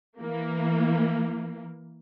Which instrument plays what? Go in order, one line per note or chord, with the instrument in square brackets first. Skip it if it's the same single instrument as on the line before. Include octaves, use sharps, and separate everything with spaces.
[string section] E3 A#3